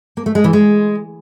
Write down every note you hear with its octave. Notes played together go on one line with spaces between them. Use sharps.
A#3
A3
G#3
E3
G#3